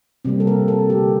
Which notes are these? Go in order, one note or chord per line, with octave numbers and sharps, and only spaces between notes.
C3 G3 A#3 C4
A4
A#4
A4
D3 A3 G4